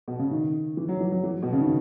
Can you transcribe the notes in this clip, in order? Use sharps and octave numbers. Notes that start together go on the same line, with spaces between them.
B2
C#3
D#3
E3
F#3
E3
F#3
E3
B2
C#3
D#3